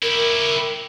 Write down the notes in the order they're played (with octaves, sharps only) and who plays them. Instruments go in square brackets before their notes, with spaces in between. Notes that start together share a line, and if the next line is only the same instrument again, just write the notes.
[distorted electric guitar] E4 G4 [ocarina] A#4